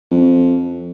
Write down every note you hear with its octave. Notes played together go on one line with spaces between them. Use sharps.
F2